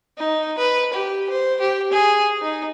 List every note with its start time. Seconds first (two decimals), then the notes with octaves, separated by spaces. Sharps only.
0.18 D#4
0.58 B4
0.94 G4
1.30 C5
1.61 G4
1.92 G#4
2.41 D#4